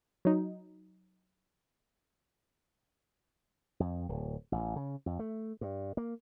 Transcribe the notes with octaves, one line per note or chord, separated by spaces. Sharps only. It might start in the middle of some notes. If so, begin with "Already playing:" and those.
F#3 D#4
F2
D1
A1
C#3
F2
A3
G2
A#3